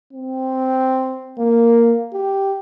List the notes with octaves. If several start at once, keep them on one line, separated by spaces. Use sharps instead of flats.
C4
A#3
G4